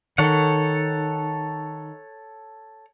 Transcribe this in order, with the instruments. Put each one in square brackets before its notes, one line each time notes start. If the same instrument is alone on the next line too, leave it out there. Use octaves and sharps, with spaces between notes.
[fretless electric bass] D#3 [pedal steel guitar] A4 C#5 F#5